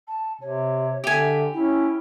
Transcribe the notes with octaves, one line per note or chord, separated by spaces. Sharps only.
A5
C3 C#5
D3 G4 E5 G#5
C#4 E4